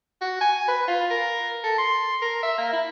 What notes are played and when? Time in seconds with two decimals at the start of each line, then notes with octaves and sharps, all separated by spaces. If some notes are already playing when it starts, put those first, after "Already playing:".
0.21 F#4
0.41 G#5
0.68 B4
0.88 F4
1.10 A#4
1.64 A4
1.78 C6
2.22 A#4
2.43 E5
2.58 A#3
2.73 E4